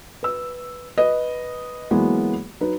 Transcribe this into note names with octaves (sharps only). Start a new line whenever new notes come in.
B4 E6
B4 D#5
E3 F#3 G#3 A#3 B3
F#3 D#4 B4